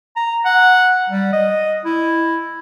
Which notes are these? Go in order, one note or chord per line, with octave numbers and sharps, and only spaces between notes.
A#5
F#5
G3
D#5
E4